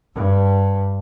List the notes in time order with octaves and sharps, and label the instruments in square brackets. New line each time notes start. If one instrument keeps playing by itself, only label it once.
[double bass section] G2